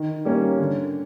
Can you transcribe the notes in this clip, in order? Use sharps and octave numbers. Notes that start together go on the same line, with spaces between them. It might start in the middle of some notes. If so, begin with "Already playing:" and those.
Already playing: D#3
G3 A#3 C#4
D3